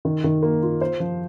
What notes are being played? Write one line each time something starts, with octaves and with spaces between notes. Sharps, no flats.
D#3
D#3
A#3
F4
C5
F3